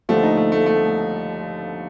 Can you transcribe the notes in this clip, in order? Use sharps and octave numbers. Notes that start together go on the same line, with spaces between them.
D#2 D3 F3 A3
D#4
A3
A3
A3